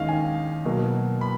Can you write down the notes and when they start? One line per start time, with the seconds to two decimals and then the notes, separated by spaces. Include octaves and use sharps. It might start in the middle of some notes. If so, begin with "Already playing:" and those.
Already playing: D#2 D#3 G#3 C#4 D#5 F5
0.08 G#5
0.65 B2 F#3 A#3
1.21 B5